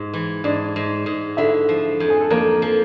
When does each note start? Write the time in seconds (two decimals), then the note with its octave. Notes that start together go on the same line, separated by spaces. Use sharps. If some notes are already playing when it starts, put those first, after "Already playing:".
Already playing: G#2
0.14 E3
0.44 G#2 D4 D5
0.76 G#2
1.06 G#2
1.37 D3 E4 E5
1.69 F3
2.00 F2
2.10 G#4
2.21 A4
2.30 F2 A#3 A#4
2.62 F3